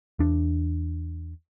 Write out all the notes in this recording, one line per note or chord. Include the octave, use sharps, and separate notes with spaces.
E2 D4